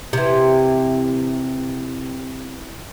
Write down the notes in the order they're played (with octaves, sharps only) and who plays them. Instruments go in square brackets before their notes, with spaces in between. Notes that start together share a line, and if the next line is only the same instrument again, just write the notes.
[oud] C3 E3